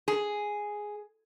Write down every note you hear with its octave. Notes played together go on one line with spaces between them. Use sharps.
G#4